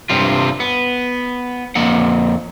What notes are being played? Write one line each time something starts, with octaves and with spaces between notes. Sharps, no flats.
G2 C3 G3 F4
B3
F2 A#3 F#5